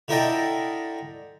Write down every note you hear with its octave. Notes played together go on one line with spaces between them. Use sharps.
D3 E4 A#4 D#5 G5 A5